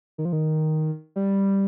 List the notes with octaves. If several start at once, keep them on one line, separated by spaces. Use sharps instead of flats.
D#3
F3
D#3
G3